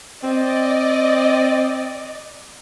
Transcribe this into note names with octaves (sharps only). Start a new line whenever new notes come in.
C4 D5 D#5